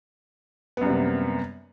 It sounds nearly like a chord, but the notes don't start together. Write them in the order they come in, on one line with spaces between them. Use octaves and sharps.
B3 F#2 G3 C3 A#3